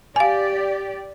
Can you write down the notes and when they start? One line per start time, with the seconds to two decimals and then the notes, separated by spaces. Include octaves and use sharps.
0.16 G4 D5 F5 G#5